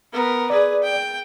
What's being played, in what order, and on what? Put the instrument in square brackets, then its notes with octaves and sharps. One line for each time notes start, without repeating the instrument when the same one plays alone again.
[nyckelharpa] B3 A#4
[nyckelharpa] G#4 B4 [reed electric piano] D5
[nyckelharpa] G5